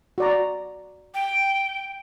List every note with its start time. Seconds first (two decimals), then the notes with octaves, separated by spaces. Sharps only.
0.18 F#4 D5 A#5
1.14 G5